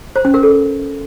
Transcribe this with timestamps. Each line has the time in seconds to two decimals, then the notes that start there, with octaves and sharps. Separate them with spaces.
0.16 C5
0.25 C#4
0.34 A#4
0.43 A4